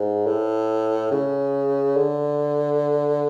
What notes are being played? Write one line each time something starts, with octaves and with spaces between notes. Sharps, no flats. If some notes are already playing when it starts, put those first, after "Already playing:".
Already playing: G#2
A2
C#3
D3